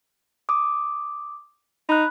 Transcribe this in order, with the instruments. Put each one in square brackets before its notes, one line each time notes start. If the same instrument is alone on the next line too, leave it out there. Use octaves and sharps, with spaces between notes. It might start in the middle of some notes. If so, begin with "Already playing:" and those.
[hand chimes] D6 D#6
[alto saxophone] D#4 [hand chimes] B5 F#6